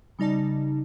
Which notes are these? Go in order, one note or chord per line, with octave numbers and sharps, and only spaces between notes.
C#3 G3 D#4 D5 A5